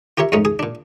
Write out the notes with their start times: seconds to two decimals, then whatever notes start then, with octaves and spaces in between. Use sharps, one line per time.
0.18 F4 G4 A#4 C#5 E5
0.32 F2 G#2 G#3 A3 C#4 D#4
0.45 G#4 D#6
0.59 A#2 D4